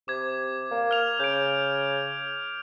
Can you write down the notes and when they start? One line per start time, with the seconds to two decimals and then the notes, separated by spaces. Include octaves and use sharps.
0.08 C3 D6 G#6
0.71 A#3
0.91 F6 F7
1.20 C#3 G6 D7